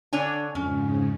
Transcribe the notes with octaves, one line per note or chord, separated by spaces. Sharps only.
D3 D4 C#5 G#5
F2 G#2 C#3 C#4